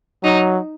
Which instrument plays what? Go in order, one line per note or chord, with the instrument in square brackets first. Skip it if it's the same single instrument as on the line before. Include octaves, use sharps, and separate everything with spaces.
[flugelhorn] F#3 [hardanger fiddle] D#4